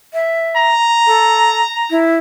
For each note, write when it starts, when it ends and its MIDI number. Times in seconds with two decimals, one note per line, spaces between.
0.13 0.70 76
0.56 1.99 82
1.07 1.61 69
1.90 2.14 64